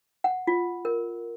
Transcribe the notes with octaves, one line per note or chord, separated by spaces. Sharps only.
F#5
F4
A#4